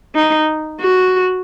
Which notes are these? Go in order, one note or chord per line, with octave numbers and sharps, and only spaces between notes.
D#4
F#4